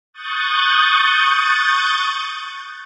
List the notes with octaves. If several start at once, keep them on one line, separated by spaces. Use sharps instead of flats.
C#6 D#6 F#6 G6 A6